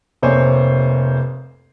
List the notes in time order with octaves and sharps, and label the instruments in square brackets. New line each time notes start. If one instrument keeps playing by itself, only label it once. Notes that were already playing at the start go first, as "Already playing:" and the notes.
[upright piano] F1 C3 A#3 C5 C#5 G#5